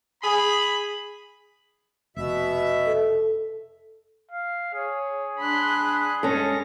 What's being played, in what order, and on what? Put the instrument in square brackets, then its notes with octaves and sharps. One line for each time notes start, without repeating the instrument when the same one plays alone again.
[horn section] G#4 B5
[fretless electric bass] F1 [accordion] B2 E5
[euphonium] A4
[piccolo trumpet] F5
[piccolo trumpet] G#4 [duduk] C#5
[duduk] D4 [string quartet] B5 C6 F#6
[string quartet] G2 A#6 [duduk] G#3 [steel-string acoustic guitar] C#4 A4